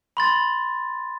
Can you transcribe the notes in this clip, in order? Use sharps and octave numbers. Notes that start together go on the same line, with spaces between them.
B5 C6 A6